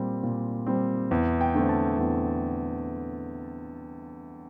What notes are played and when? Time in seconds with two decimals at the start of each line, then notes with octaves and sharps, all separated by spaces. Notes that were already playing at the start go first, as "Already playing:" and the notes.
Already playing: A#2 G3 C4
0.23 A#2
0.67 G3 C4
1.11 E2
1.41 G5
1.55 D3 A3 C4
1.69 A5
1.99 E2